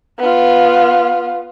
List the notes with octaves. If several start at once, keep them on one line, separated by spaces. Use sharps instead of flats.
B3 F4